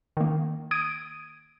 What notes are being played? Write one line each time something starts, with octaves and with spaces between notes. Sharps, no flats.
D#3 A#3
D#6 G#6 D7 D#7